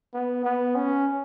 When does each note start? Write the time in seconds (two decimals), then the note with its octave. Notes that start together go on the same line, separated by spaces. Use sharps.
0.14 B3
0.44 B3
0.75 C#4